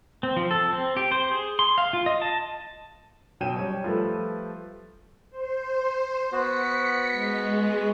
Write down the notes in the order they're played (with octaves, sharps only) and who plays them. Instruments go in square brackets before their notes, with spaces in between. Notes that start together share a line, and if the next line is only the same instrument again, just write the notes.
[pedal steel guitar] C4
F3
A4
C4
G4
C5
G#4
C6
F5
F4
D#5
A5
[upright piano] B2 F#3 C#4 G5 D#7 E7
G3 C#5
F3 G3 A3 A4 B4
[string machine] C5
[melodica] B3 F#4 [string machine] B6 C#7
[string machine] G#3